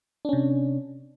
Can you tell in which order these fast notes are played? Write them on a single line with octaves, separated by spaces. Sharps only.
D4 C#4 C3